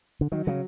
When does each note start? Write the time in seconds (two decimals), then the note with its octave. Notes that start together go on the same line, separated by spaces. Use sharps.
0.21 D3
0.32 D#3 F#3
0.47 C#3 F#3